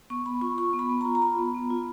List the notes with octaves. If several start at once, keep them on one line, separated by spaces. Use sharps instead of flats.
B3 C#6
B3 B5
F4 C#6
F4 C#6
B3
B5
B3
F4 A#5
A#5
F4 B5
B3
B3
F4